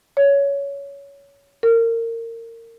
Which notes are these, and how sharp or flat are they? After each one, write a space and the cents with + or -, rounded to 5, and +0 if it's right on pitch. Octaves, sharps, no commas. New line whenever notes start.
C#5 +15
A#4 -25